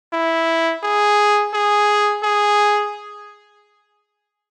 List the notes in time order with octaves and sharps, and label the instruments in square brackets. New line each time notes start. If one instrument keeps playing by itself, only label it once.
[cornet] E4
G#4
G#4
G#4